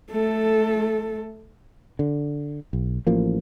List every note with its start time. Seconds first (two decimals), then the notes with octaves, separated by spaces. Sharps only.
0.11 A3 A4
1.99 D3
2.73 B1
3.07 A1 F3 A#3